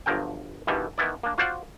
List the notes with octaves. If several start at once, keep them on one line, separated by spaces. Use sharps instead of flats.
G1 G2 F3 F#3 A#4 G5
G2 B2 D#3 E3 G3
D#3 E3 B3 E4 D5
A#3 D4
F4 F#4 C5 D5 F5 F#5